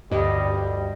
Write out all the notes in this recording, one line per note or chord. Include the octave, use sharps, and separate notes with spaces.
D2 G2 G3 G4 D#5